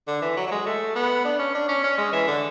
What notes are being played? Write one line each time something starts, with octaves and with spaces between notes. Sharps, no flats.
D3
E3
F#3
F#3
G#3
A3
B3
D4
C#4
D4
C#4
C#4
G#3
E3
D3